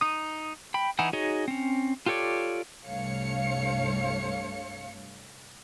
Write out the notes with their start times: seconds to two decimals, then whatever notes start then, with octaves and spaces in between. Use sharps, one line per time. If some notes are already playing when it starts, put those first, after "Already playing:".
0.01 D#4 D#6
0.74 G5 B5
0.99 E3 D#4 E4 F#5 G#5
1.13 D#4 F#4 G#4 C#5 D#5
1.48 C4 C#4
2.06 F4 G4 A4 C#5 D5
2.86 C2 G2 A3 C#5 F5 C#7